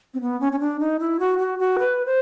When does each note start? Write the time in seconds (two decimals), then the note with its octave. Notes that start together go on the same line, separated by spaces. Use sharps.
0.14 C4
0.21 B3
0.40 C#4
0.52 C#4
0.60 D4
0.80 D#4
1.00 E4
1.20 F#4
1.39 F#4
1.59 F#4
1.79 B4
2.06 C5